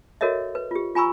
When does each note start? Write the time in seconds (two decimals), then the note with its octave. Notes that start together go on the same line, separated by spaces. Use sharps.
0.21 F#4 A4 A#4 C#5 D#5 E5
0.55 B4
0.71 F4 G4
0.95 F4 G#5 A#5 B5 C#6 E6